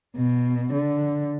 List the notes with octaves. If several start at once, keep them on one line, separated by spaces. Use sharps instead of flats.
B2
D3